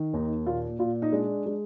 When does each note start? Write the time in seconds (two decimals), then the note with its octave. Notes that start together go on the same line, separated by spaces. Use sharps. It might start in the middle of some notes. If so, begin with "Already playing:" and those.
Already playing: D#3
0.14 D#2 D#4
0.46 A#2 F4
0.79 A#2 F4
1.02 D#4
1.12 G#3 D4
1.46 G#3